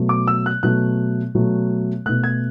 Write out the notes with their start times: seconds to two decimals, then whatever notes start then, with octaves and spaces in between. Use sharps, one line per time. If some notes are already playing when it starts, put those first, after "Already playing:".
Already playing: B2 F#3 A3
0.09 D6
0.28 E6
0.46 F#6
0.63 B2 F#3 A3 F#6
1.35 B2 F#3 A3
2.06 B2 A3 F#6
2.24 G#6